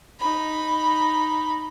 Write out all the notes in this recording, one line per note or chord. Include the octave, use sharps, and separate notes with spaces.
D#4 B5